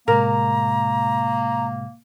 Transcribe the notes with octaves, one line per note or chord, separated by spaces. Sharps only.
A2 C3 G#3 A#3 A#4 A#5